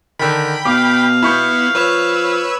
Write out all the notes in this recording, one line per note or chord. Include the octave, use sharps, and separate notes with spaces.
D3 D#3 G5 B5
B2 F5 D6
B3 E4 B5 C#6 G6
F3 B4 C#5 E6